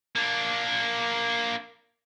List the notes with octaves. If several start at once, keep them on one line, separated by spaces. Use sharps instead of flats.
A#3 D4